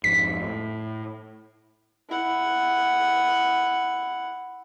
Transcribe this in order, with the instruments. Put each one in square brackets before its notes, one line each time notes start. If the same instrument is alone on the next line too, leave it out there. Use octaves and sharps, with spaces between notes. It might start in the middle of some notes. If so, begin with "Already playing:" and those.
[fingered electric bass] F2 G#2 [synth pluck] B6
[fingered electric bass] A2
[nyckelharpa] E4 F#5